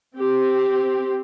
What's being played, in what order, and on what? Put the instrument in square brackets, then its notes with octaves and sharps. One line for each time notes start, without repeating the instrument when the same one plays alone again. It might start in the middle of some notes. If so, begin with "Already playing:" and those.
[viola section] C4 G4